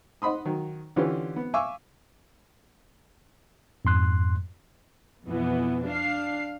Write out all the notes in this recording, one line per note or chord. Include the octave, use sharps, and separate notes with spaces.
D#5 F#5 B5 C6 D#6
D#3 F#3
D3 E3 C#4 F4 G4 B4
B3
E5 F5 G#5 C#6 D6 E6
F2 G#2 C6 F#6
F2 B2 E3 B3
D4 F5 C7